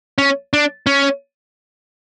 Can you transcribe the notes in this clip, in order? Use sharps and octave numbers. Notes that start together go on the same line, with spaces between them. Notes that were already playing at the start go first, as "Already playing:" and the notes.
C#4
D4
C#4